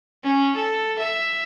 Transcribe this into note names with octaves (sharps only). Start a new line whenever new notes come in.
C#4
A4
E5